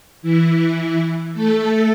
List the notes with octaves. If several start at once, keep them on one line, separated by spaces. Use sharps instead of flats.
E3 E4
A3 A4